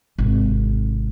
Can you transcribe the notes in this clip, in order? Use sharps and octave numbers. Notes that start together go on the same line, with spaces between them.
G#1 C3